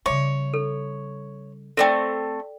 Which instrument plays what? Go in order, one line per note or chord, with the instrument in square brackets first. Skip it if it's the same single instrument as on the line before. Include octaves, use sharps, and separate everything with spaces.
[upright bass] C#3 G3 [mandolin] C#5 [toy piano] E5 C6
[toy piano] A4
[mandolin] A3 B3 C4 [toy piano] A4 D5 G5